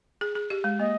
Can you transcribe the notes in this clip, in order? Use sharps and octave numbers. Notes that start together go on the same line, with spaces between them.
G#4
G#4
G4
G#3
A#3 D#5